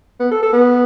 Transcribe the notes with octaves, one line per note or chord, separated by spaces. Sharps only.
B3
A4
A4
B3